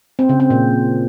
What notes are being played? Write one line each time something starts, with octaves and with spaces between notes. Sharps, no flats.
C4
C#3
C4
A#2